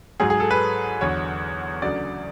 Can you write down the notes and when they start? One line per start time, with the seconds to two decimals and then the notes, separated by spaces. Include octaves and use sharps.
0.20 G#2 F#3 G#4
0.30 G#4
0.40 A4
0.51 B4
1.01 E2 D3 F#3 C#5
1.82 D2 C#3 F#3 D5